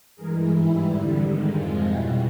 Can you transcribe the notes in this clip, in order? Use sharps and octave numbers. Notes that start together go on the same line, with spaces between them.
G2 E3 G#3 G#4 A#4
G#2 E3 G3 E4
F2 D3 G3
G#2 D#3 G#3
F2 C3 F3 G#3 F4
B2 G3 E4 F#4